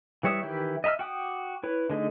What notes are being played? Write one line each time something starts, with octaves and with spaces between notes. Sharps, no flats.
E3 G3 C#5 E5 D#6
D#3 E3 E4 G4
D#5 E5 A#5 E6 F6
F#4 G5 D6 D#6
E4 B4 C#5
D3 G#3 A3 D#4